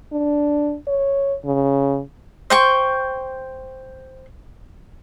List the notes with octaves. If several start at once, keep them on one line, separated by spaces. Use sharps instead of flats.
D4
C#5
C#3
C5 G5 C#6